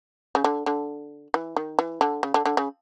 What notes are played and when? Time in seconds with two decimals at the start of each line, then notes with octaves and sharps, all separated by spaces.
0.35 C#3
0.44 D3
0.66 D3
1.34 E3
1.56 D#3
1.79 E3
2.01 D3
2.23 C#3
2.34 D3
2.45 D3
2.57 C#3